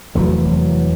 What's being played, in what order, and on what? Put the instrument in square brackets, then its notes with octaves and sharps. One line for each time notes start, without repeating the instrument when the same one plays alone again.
[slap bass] F1 E2 A3 [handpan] E3 F#3